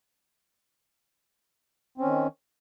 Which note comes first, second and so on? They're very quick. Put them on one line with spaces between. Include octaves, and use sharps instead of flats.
C4 C#4 D#3